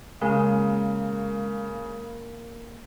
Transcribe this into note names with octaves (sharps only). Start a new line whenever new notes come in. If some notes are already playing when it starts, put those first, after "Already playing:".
C#3 G#3 A#3 A#4